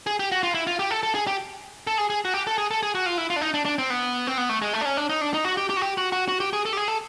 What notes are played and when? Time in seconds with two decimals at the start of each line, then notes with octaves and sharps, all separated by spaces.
0.07 G#4
0.19 G4
0.32 F#4
0.43 F4
0.54 E4
0.67 F4
0.79 G4
0.91 A4
1.03 A4
1.15 G#4
1.27 G4
1.87 A4
1.98 G#4
2.10 G#4
2.25 F#4
2.34 G4
2.47 A4
2.58 G#4
2.71 A4
2.83 G#4
2.95 F#4
3.06 F4
3.18 E4
3.30 F4
3.36 D4
3.41 D#4
3.54 D4
3.65 D4
3.78 C4
3.90 B3
4.27 C4
4.38 B3
4.49 A3
4.62 G#3
4.73 A3
4.81 D4
4.85 C#4
4.97 D4
5.10 D#4
5.21 D4
5.34 D#4
5.45 F#4
5.57 G4
5.70 G4
5.77 F#4
5.81 G4
5.97 F#4
6.12 F#4
6.28 F#4
6.40 G4
6.53 G#4
6.65 A4
6.73 G4
6.77 G#4
6.88 A4